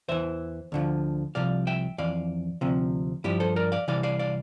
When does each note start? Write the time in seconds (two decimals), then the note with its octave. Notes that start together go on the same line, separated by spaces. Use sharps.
0.09 E2 E3 C5 E5
0.72 D2 D3 F3
1.35 C2 C3 F3 D5 F5
1.67 E5 G5
1.98 F2 E3 D5 F5
2.61 D2 C3 F3
3.24 G2 F3 E4 G4
3.40 A4 C5
3.56 A#4 D5
3.72 D5 F5
3.88 C2 C3 E3 D5 F5
4.03 D5 F5
4.19 D5 F5